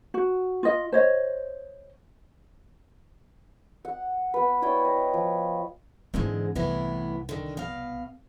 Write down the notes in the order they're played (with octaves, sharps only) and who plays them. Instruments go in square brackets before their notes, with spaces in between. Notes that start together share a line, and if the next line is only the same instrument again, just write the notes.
[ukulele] F#4
F4 D#5
C5 C#5 D#5
[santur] F#5
B3 B4
E4 C#5 D5 G5
D#5
F3
[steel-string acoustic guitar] G#2 D3 G#3 [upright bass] E3 C4
[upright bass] C2 [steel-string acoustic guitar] A2 E3 B3
[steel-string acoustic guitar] D3 D#3
B2 F5